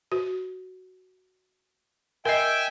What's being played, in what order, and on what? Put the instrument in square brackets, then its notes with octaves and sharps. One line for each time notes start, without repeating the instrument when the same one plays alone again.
[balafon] F#4
[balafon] A#4 D#5 [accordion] E5 G5 G#5